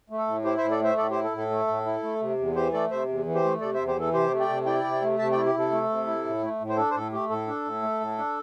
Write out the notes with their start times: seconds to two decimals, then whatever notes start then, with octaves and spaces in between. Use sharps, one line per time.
0.10 A3
0.18 A4
0.27 A2
0.45 E4 G4 C5
0.57 C5 E5
0.62 A2
0.71 A4 D5
0.80 A3 C5 E5
0.97 A2 A4 D5
1.11 E4 G4 C5
1.24 A4
1.32 A2
1.38 A4
1.50 A3
1.67 A2
1.86 E4
2.03 A3
2.21 C3
2.38 E2
2.56 E3 G4 C5
2.73 A3 A4 D5
2.91 C3 C5 E5
3.08 E2
3.26 E3
3.35 G4 C5
3.44 A3
3.61 C3 A4 D5
3.74 C5 E5
3.79 E2
3.87 G4 C5
3.96 E3 A4
4.13 C3 G4 C5
4.31 A3
4.40 D5 G5
4.49 C3
4.66 E4 D5 G5
4.84 C3
5.02 A3
5.19 C3 E5 A5
5.32 D5 G5
5.37 E4
5.46 G4
5.55 C3 A4
5.71 A3
5.89 C3
6.07 E4
6.25 A2
6.42 A3
6.60 A2
6.69 C5
6.77 D4 A4
6.90 C5
6.95 A2 A4
7.12 A3 G4
7.30 A2 A4
7.47 D4
7.65 A2
7.82 A3
8.00 A2
8.18 D4